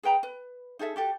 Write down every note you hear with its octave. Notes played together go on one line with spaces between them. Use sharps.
G#4 B4 G5 A#5
B4
D#4 G#4 A4 E5
F#4 G4 A4